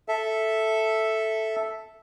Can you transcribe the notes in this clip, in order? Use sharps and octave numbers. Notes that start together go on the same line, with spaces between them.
A4 E5